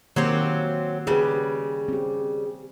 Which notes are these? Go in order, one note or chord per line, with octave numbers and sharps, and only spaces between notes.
D#3 F#3 A#3 C4 G4
C#3 G3 G4 B4
C4 G4